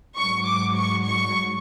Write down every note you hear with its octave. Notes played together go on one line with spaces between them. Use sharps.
G#2 F#3 C#6
D6
C#6
C#6